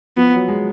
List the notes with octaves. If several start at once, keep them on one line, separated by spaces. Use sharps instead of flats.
F3 B3
F#3
G#3